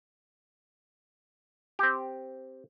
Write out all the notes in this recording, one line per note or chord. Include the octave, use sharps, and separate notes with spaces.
C4 G4